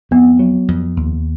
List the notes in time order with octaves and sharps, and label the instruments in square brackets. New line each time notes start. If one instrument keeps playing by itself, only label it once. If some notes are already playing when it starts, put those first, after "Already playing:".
[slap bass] F2 [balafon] B3
[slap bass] F#3
F2
D#2